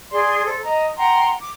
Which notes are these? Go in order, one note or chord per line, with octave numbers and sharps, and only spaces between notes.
G#4 D5 C6
A4 C5
D#5 A#5
F#5 G5 A#5 C6
D6